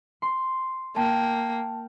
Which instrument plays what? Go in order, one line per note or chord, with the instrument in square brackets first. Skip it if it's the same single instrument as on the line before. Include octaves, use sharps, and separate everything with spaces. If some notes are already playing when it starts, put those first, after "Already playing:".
[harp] C6
[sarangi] A#3 [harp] G5 [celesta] A5